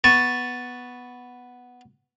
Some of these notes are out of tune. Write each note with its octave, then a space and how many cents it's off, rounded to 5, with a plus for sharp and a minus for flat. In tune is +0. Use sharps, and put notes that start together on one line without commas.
B3 +0 A5 +0 C#6 +0